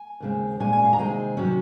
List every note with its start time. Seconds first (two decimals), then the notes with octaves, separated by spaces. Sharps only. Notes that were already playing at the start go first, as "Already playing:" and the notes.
Already playing: G#5
0.20 D#2 C#3 G#3 C4
0.60 A#2 G#3 C#4 G#5
0.73 G#5
0.85 F5
0.93 A#5
0.99 C3 D#3 G#3 C4 G#5
1.37 C3 D#3 F#3 C#4